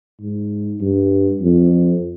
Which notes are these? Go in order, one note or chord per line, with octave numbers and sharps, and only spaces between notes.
G#2
G2
F2